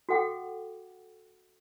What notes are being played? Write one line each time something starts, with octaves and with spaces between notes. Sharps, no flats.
F#4 A4 F#5 G5 D6